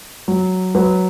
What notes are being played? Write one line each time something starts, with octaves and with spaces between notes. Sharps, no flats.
F#3
F#3 B4